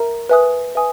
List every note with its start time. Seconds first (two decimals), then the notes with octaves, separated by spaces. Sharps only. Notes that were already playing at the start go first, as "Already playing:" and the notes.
Already playing: A#4 E5 A#5
0.29 B4 E5 G#5 D#6 F#6
0.75 B4 E5 G#5 D#6